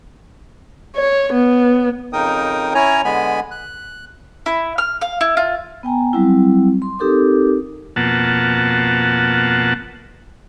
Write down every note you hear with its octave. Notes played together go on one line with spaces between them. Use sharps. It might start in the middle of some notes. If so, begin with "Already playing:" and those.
C#5
B3
F2 C#3 D#4 A#4 G5 D#6
C#4 E4 C#5 G#5 A#5
D3 G#3 B3 G#5 B5
F#6
E4
F6
F5
E4
F4
B3 G5 G#5 A#5
F#3 G3 C4 E4
C6
C4 D#4 G4 A4 A#4 D6
F2 B2 A#3 F#5 A5